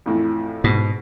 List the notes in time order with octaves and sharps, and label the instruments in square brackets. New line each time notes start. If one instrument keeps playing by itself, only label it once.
[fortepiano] F2 A2 E3
[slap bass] G#2 [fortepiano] B2